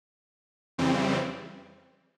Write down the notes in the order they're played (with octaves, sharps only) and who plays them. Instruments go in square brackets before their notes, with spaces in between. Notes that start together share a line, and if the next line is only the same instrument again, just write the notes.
[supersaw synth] F2 C#3 E3 G3 C4